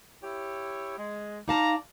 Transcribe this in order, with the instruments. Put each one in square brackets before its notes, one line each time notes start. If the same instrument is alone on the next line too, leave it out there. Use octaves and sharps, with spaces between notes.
[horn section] E4 G4 C#5
G#3
[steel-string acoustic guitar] D#4 F5 A5 [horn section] D5 A#5